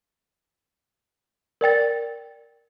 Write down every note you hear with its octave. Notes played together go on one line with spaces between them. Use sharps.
A#4 D5 G5 A6